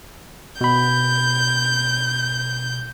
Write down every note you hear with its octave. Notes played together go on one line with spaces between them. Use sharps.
B2 B5 G6